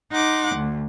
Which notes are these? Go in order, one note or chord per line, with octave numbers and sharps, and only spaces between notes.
D#4 F#5 C6 D6
D2